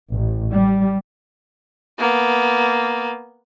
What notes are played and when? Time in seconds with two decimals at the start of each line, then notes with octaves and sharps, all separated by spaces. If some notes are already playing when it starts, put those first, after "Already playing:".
0.11 A1
0.53 G3
1.99 A#3 B3